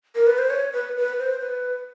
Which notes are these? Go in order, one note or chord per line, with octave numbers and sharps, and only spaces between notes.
A#4
B4
C5
C#5
B4
B4
C5
B4